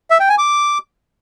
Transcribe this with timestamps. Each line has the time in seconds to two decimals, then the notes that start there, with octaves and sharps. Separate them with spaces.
0.11 E5
0.20 G5
0.29 G#5
0.38 D6